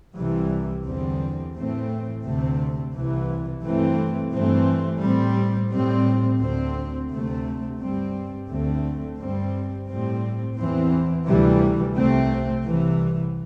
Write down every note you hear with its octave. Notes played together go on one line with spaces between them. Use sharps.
C2 C3 E3 G3
E2 D3 G3 C4
A2 E3 A3 C4
D2 C3 A3 C4
C2 C3 E3
G2 E3 A3 C4
G2 E3 A3 C4
A2 G3 C4
A2 G3 C4
D2 D3 C4
D2 C3 A3 C4
G2 G3 C4
D2 D3 A3 C4
G2 G3 C4
A2 G3 C4
E2 E3 C4
D2 C3 E3 G3
C2 C3 A3 C4
C2 C3 E3